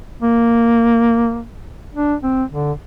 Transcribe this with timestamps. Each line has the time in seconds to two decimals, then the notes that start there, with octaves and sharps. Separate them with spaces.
0.23 A#3
1.94 D4
2.23 C4
2.52 D3